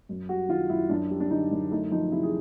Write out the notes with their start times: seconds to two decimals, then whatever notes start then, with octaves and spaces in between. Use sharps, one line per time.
0.09 F#2
0.29 G3 F#4
0.49 D#3 F4
0.69 F#2 E4
0.90 F#2 D4
1.10 G3
1.20 D4
1.31 D3 D#4
1.51 F#2
1.71 A3 D#4
1.91 F3 D#4
2.12 C3 E4
2.23 G#4